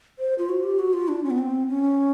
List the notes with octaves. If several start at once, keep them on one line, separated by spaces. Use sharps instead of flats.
C5
F4
F#4
G4
F#4
F4
D4
C#4
B3
C4
C#4